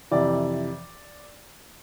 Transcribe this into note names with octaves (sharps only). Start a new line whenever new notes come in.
F2 C3 E3 D5